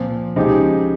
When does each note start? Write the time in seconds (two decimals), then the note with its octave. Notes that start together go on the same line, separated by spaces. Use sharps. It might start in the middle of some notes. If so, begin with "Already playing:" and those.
Already playing: A#2 F3 C4
0.36 C#3 F3 G#3 D#4 G4